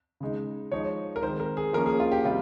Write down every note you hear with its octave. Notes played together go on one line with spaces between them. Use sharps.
C#3 G#3 D#4
F3 G#3 D#4 C#5
A#4
D#3 G#3 C4 C5
A#4
G#4
F3 A#3 C#4 A#4
G#4
F4
G4
C3 G3 F4